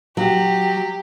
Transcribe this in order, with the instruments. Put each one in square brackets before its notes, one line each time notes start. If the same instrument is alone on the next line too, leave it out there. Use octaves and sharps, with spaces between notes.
[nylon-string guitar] F#3 [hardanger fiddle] G4